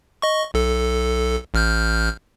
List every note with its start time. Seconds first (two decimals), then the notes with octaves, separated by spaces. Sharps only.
0.22 D#5 C#6
0.54 B1 A4
1.54 A1 F6 G6